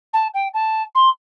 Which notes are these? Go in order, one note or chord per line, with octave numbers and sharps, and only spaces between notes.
A5
G5
A5
C6